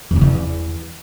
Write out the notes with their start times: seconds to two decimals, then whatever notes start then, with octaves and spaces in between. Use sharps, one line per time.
0.11 F2
0.16 C#3
0.21 E2